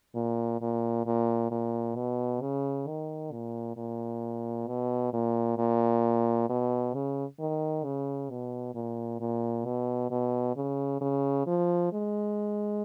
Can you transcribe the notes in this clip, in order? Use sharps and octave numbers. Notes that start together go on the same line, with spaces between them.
A#2
A#2
A#2
A#2
B2
C#3
D#3
A#2
A#2
B2
A#2
A#2
B2
C#3
D#3
C#3
B2
A#2
A#2
B2
B2
C#3
C#3
F3
G#3